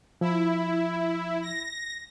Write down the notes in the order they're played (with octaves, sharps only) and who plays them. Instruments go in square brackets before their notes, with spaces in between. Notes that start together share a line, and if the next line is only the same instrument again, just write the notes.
[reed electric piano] F3 [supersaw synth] E4
[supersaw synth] A#6